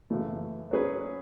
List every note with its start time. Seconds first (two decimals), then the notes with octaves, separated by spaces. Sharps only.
0.10 F#2 C#3 E3 A3
0.71 F#3 C#4 G#4 B4